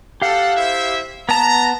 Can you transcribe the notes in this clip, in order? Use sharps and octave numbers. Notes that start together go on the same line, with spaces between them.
G4 A4 F5 F#5
E4 C5 E5
B3 A5 A#5